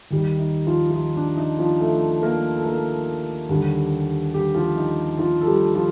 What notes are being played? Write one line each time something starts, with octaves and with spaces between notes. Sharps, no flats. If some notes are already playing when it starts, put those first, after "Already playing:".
D#2 D#3 G3
D#4
F3 F4
F4
D#4
D4
D#4
F3 F4
A3 A4
A#3 A#4
A4
A#3 A#4
D#2 D3 G3
G3 G4
F3 F4
D#4
F3 F4
A4
G3 G4
F3 F4